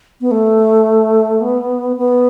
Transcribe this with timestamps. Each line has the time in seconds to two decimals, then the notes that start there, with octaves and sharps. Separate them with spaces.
0.21 B3
0.31 A3
1.41 B3
1.97 B3